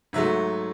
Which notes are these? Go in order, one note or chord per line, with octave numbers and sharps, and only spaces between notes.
G#2 F#3 A3 E5